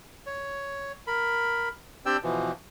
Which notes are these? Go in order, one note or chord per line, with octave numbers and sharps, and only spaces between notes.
C#5
A#4 B5
C4 D4 G4 D5 G5 E6
B2 E3 F3